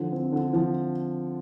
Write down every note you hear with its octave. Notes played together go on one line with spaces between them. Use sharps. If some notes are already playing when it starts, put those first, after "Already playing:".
Already playing: D3 F3
C4
D3
F3